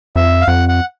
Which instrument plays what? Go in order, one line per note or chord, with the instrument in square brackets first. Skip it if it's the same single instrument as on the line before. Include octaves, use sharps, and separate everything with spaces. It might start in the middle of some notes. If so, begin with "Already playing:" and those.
[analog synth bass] F2 [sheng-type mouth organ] E5
[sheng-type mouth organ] F5
[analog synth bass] F2 [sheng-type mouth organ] F#5
[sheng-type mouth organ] F#5